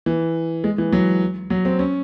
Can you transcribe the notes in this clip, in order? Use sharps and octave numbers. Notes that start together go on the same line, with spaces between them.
E3
G#3
E3
F#3
F#3
C4
C#4